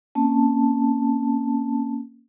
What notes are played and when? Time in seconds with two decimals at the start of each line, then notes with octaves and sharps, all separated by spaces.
0.15 A#3 C4 C#4 A5